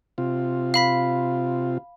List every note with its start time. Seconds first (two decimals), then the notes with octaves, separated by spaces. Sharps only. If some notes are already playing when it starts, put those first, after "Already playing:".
0.18 C3 F4
0.74 F5 B5 B6